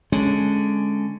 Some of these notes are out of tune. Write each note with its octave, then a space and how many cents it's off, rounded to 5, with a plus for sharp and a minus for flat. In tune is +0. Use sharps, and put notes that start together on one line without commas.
D3 +0 G#3 +10 C#4 +0